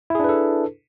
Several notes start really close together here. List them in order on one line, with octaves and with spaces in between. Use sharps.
E4 G#4 D4 B4 A4